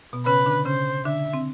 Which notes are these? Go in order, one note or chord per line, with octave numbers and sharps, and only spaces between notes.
B2 B3
C#3 C#4 B4
D3 D4
C#3 C#4 C5
D3 D4 E5
C4